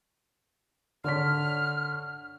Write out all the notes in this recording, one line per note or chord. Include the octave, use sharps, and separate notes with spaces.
D3 C#5 F6 B6